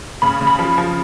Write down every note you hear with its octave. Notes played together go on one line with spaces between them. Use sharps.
C#3 B5
C#3
B5
F3
F3